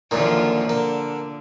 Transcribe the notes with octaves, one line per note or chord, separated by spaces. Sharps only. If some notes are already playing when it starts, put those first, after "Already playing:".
F#2 A#2 D3 D#3 F3 F4
D3 A#3